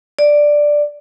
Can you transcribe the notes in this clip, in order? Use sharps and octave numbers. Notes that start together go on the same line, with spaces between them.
D5